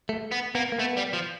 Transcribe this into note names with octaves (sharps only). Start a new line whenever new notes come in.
A3
B3
A#3 B3
A#3
A3 B3
G3
F3